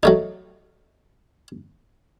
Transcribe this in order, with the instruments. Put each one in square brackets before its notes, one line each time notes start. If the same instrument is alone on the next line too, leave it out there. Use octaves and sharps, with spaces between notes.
[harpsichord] F#3 A3 D#4